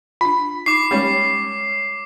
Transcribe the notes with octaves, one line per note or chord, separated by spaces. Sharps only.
D4 F4 B5
D#4 D6 C7
G3 G#3 C#4